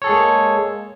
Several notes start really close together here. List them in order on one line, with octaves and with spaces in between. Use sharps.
C#5 A4 G#4 G#3 A#3